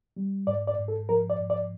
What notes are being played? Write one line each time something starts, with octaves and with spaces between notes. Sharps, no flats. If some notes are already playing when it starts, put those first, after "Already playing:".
G3
G#2 D5
D5
G#2
A4
F3 A#4
D5
G#2
D5